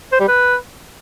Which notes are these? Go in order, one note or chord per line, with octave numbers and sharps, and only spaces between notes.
C5
G3
B4